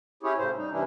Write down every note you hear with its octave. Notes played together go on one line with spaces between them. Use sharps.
C#4 E4 G4 G#4 C#5
A2 C#3 C5
G3 D#4
G2 C3 E3 C#4 D4 E4